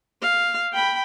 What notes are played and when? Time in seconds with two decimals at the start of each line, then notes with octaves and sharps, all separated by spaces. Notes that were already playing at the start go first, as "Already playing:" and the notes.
0.22 F5
0.73 G5 B5